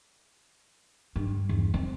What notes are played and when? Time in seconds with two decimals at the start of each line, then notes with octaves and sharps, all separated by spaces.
1.16 G2
1.49 E2
1.74 C4